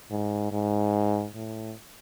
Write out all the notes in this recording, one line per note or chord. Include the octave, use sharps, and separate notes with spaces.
G#2
G#2
A2